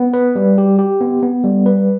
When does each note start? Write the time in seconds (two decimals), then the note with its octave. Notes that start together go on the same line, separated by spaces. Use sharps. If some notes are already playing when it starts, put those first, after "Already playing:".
Already playing: B3
0.14 B4
0.36 G3
0.58 G4
0.79 G4
1.01 B3
1.23 B3
1.44 G3
1.66 B4